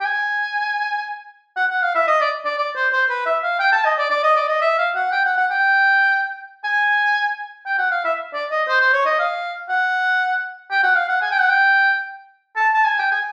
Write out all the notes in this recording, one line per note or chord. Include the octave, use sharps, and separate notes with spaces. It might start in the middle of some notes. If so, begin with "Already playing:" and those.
G5
G#5
F#5
F#5
F5
E5
D#5
D5
D5
D5
C5
C5
B4
E5
F5
G5
A5
D#5
D5
D5
D#5
D5
D#5
E5
F5
F#5
G5
F#5
F#5
G5
G#5
G5
F#5
F5
E5
D5
D#5
C5
C5
C#5
D#5
F5
F#5
G5
F#5
F5
F#5
G#5
G5
F#5
G5
A5
A5
G#5
G5
G#5